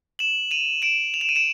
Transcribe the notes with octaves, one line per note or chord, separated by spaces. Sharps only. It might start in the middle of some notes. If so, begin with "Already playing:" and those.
E7 F#7
D#7 F7
D7 E7
F7
E7
D#7
D7 E7